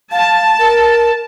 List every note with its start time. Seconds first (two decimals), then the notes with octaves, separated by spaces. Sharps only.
0.12 F5 A5
0.59 A#4